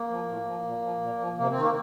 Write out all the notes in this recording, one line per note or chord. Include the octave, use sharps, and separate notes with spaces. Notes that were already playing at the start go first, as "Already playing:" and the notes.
Already playing: A#3
F3
A2
F3
A#2
F3
A#2
F3
C3 A#3
C4
D#3
A#3